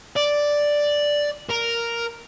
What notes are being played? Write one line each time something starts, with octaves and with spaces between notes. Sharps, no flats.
D5
A#4